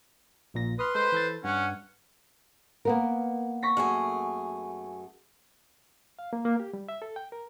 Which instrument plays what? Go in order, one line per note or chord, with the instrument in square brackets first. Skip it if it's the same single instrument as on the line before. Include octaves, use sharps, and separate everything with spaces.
[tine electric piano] A#1 A#2 A#6
[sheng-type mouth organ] B4 C6 [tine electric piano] D#6 F6
[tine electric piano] G#3 A4 [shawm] C5
[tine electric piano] E3 A4 A6
[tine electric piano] G2 F#6 [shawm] C#4 [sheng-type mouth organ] F#5
[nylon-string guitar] A#3 B3 A#4
[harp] C#6 A#6 B6
[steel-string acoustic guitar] F#2 A3 G#4
[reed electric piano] F5
A#3
A#3
G4
G3
E5
A4
G5
A#4